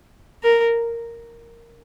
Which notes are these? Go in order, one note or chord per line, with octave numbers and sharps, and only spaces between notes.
A#4